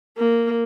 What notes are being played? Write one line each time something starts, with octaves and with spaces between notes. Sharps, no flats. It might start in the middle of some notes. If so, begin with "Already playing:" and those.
A#3